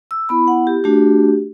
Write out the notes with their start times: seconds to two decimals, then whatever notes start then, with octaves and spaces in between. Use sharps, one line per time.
0.11 E6
0.29 B3 E4 B5
0.48 F#5
0.67 G4
0.84 A3 D4 F#4 G4